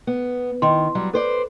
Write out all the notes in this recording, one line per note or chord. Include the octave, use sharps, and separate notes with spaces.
B3
D#3 C6
F#3 G3
A4 B4 C5 D5